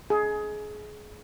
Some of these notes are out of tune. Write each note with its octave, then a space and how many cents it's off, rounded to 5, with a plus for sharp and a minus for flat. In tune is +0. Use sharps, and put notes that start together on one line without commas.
G#4 +20